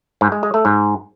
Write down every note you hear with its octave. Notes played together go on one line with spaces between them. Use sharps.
G#2
G#3
G#3
A3
G#2